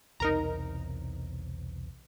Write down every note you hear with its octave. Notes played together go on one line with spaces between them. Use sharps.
B1 E2 C3 D#4 A#4 A#5